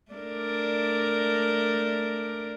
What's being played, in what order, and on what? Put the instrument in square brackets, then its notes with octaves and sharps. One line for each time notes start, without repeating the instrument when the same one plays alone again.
[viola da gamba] A3 D4 A#4